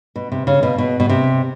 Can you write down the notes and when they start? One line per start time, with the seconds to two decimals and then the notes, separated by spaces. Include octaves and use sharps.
0.16 B2
0.32 C3
0.47 C#3
0.63 B2
0.78 B2
1.00 B2
1.09 C3